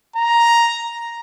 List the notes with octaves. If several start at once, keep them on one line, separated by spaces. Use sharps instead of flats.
A#5